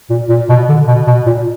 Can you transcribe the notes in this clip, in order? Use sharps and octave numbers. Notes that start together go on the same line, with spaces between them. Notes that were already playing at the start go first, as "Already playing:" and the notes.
A#2
A#2
B2
D3
B2
B2
A#2